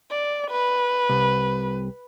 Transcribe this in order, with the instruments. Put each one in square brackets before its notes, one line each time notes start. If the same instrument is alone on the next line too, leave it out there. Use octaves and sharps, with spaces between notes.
[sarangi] D5
B4
[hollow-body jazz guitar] C2